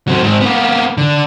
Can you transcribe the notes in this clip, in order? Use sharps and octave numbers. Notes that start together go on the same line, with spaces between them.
F#3 C4
G#2 C4
A#3 B3
D3